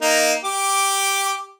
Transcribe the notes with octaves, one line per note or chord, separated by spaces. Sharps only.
A#3 D#4
G4 D6